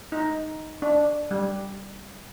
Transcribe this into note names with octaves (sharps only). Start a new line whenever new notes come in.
D#4
D4
G3